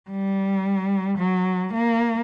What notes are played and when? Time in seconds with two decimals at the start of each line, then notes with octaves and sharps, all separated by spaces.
0.10 G3
1.18 F#3
1.73 A#3